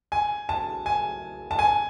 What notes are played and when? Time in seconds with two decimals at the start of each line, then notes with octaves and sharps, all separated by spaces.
0.12 G#5
0.49 A5
0.86 G#5
1.51 A5
1.59 G#5